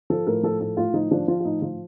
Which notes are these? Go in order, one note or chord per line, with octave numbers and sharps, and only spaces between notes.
F3 A4
A2 A#4
F3 A4
A2 A4
A2 F4
F3 D#4
F3 D4
F3 F4
F4
A2 D#4
F3 F4